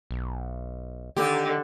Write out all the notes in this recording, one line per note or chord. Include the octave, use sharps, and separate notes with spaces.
B1
D3 D#3 G4